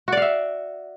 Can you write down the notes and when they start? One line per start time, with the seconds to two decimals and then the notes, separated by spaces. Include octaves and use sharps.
0.08 F#4
0.12 D5
0.17 F5
0.22 E5